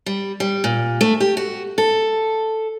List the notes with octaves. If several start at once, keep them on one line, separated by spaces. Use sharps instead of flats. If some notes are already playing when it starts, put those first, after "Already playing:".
G3
G3
A#2
A3
G4
F#4
A4